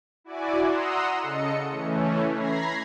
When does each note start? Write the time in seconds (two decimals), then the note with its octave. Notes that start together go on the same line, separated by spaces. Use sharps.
0.24 E4 F#4 D5 G#5 D6
0.61 F#5 A#5 C6 D#6 E6
1.21 C#3 A4 D#5 C#7
1.69 E3 A3 C#4
2.34 A#5 B5 G#6 A#6 C7